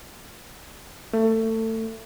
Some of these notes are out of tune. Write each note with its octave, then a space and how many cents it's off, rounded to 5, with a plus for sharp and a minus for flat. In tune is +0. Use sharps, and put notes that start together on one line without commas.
A3 +25